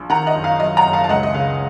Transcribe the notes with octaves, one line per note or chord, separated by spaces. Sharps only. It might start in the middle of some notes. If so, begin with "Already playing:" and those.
Already playing: A#1
D#3 F#5 A#5
D#5 F#5
F#1
F5
F#3 D#5
F#5 A#5
F#1
F5 A5
A5
C#2 D#5 F#5
D#5
C#3 F5